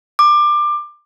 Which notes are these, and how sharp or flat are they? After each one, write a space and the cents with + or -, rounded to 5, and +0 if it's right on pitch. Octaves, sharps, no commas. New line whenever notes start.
D6 +20